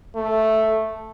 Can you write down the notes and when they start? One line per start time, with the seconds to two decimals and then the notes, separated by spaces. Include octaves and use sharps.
0.15 A3